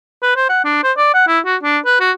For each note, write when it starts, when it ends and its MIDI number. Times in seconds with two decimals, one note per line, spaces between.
0.23 0.35 71
0.36 0.48 72
0.49 0.63 78
0.64 0.79 62
0.83 0.92 72
0.97 1.09 74
1.14 1.25 78
1.27 1.39 64
1.45 1.56 66
1.63 1.78 62
1.85 1.97 71
2.00 2.12 66